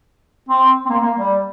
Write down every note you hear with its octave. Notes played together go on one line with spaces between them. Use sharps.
C4
C4
A#3
A#3
G3